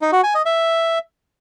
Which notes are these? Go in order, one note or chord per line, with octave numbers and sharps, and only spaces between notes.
D#4
F#4
G#5
D#5
E5